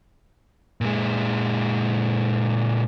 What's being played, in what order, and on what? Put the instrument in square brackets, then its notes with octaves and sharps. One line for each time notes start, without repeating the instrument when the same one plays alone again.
[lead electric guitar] A#2 G#3